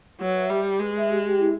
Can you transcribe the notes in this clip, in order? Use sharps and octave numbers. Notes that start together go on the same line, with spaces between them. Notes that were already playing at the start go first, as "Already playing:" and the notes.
F#3 B4
E5
G3 G4
G4
G#3 B4
E5
G4
G4
E4